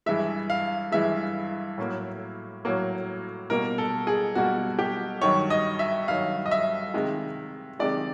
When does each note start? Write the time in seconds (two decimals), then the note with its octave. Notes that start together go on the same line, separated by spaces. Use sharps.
0.06 G2 E3 G#3 E5
0.50 F5
0.92 G2 E3 G#3 E5
1.78 A2 F#3 A#3
2.65 A2 F#3 A#3
3.50 B2 G3 A#3 A#4
3.78 A4
4.07 G#4
4.35 B2 G3 A#3 F#4
4.79 G4
5.22 G2 D#3 F#3 C#5
5.50 D#5
5.79 E5
6.08 G2 D#3 F#3 F5
6.46 D#5
6.51 E5
6.94 C3 D#3 G#3
7.79 C3 D#3 G#3 D5